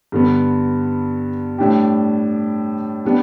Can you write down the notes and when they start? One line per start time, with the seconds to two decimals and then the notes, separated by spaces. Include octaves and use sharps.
0.12 G2 D3 B3
1.58 A2 G3 D4 G4
3.05 G3 B3 D4